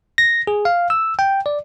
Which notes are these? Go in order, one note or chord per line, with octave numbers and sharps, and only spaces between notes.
A#6
G#4
F5
E6
G5
D5